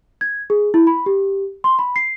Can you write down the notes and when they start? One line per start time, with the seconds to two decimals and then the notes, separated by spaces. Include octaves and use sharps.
0.21 G#6
0.50 G#4
0.74 E4
0.87 B5
1.06 G4
1.64 C6
1.79 B5
1.96 C7